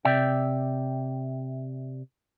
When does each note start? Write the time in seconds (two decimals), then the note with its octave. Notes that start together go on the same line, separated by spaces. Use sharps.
0.05 C3 D5 E5 G5